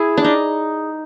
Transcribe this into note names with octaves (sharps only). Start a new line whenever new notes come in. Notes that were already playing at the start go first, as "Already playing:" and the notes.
Already playing: E4 G#4
D4
D#4